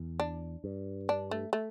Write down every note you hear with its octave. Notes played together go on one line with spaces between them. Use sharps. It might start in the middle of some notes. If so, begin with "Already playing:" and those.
Already playing: E2
D4
G2
D4
A3
A3